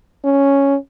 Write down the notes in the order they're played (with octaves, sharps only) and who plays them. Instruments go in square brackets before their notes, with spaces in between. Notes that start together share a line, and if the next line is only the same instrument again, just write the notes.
[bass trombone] C#4